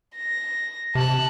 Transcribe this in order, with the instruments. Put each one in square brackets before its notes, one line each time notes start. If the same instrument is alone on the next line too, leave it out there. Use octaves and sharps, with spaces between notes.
[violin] A#6
[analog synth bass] C3 [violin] A5 F#6